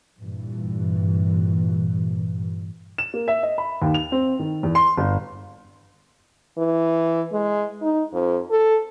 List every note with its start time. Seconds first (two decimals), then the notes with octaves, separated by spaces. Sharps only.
0.20 G2 A#2 E3
2.98 E7
3.14 A#3
3.28 E5
3.43 D#5
3.58 B5
3.82 D#2
3.94 F7
4.12 C4
4.39 D#3
4.63 E2
4.75 C6
4.98 G1
6.58 E3
7.32 G#3
7.82 D#4
8.13 F2
8.50 A4